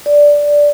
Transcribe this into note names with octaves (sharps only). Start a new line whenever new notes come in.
D5